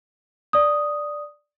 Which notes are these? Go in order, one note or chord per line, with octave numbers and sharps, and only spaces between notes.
D5 D#6